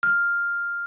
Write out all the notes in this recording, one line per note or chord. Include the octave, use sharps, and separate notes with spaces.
F6